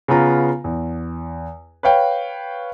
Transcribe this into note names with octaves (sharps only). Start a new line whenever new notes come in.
C#3 B3 F4 A#5
E2
B4 C#5 F5 G5